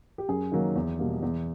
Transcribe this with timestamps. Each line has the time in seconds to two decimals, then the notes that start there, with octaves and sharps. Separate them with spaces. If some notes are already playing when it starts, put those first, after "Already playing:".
0.18 G4
0.28 F#2 G#4
0.52 D#3 F#3 A#3
0.75 E2
0.99 B2 G3 A#3
1.22 E2